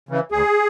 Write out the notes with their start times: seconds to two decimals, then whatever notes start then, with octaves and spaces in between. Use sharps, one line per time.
0.09 C#3 E3
0.32 D2 G#4